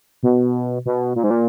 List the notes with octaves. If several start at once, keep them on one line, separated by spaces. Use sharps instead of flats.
B2
B2
A#2
G#2
A#2